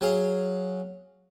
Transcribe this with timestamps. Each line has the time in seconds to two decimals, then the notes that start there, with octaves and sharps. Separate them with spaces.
0.01 F#3 G#4 F5